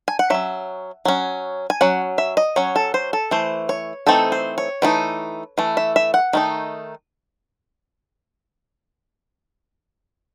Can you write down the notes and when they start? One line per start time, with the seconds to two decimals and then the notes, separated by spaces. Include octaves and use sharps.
0.08 G#5
0.19 F#5
0.30 F#3 C#4 E5
1.05 F#3 C#4
1.70 G#5
1.81 F#3 C#4 F#5
2.18 E5
2.37 D#5
2.56 F#3 C#4 C#5
2.76 A4
2.94 C5
3.13 A4
3.31 E3 A3 C5
3.69 C#5
4.07 E3 A3 C4 D#4 A4
4.32 C5
4.58 C#5
4.82 E3 A3 C4 D#4
5.58 E3 A3
5.77 E5
5.96 E5
6.14 F#5
6.33 D#3 A3 D#4